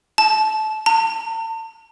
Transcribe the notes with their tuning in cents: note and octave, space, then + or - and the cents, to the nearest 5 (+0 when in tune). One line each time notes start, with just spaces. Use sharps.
A5 -25
A5 +40